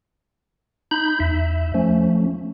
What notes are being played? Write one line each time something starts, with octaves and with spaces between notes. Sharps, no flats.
D#4 B5 G6
E2 E5
F3 A3 C#4